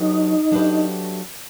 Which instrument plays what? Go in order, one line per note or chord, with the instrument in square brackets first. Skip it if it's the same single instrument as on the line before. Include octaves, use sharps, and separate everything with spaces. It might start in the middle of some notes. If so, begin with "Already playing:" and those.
Already playing: [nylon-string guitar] F#3 A3 D4 G4 B4 [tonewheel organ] D#4
[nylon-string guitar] F#3 A3 D4 G4 B4